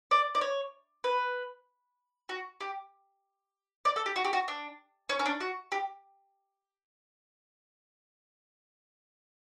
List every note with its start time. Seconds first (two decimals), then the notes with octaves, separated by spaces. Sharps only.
0.11 D5
0.35 D5
0.41 C#5
1.04 B4
2.29 F#4
2.61 G4
3.85 D5
3.96 A4
4.06 G4
4.16 F#4
4.25 G4
4.33 F#4
4.48 D4
5.09 C#4
5.19 C#4
5.26 D4
5.40 F#4
5.72 G4